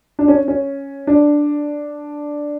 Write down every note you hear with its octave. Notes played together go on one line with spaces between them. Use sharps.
D4
C#4
C#4
D4